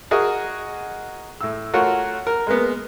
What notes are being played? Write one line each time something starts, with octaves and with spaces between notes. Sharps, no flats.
F#4 G#4 A#4 D#5
A2 E6
A3 F4 F#4 A#4 C#5 F#5
A#4
G#3 A#3 B3